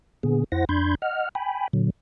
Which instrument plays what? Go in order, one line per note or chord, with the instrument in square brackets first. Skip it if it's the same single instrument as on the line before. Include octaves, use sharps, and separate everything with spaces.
[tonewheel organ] A#2 D3 B3 G#4
F2 E4 C5 F#5 A#6
F2 D4 B5 C6 G6 G#6
D#5 F#5 F6
G5 G#5 B5
A#2 D3 F#3